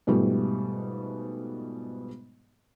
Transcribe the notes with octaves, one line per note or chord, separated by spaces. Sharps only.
G#2 B2 F3 G3 A3